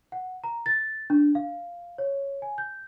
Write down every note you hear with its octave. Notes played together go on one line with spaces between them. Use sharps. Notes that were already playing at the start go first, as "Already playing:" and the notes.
F#5
A#5
A6
D4
F5
C#5
G#5
G6